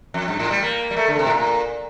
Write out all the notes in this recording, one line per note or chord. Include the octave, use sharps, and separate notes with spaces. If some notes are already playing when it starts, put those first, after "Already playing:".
F2
G2
A2
G3
A#3
G3
A3
D3
C3
A2
A#2